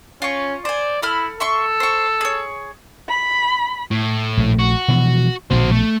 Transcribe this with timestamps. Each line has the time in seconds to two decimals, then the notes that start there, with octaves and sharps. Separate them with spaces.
0.22 C#4 F4 C#6
0.65 C5 D5 G#5
1.02 E4 A4 B5 F6
1.40 A4 E5 C6 C#6
1.80 C5 C#6
2.21 G#4 C#5
3.09 B5
3.91 A2
4.37 A#1 A3
4.59 F#4
4.88 B2 E3 F3
5.51 A#1 B2 F#4 C5
5.72 A3